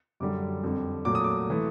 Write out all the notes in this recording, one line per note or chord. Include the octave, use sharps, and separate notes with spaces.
F#2 D3 G3 D6
F2 D3 G3
A#2 F#3 A3 D6
D#6
D6
E3 A3